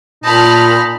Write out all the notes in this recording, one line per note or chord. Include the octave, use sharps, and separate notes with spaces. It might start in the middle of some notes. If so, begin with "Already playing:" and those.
A#2 D#4 A5 B5 F6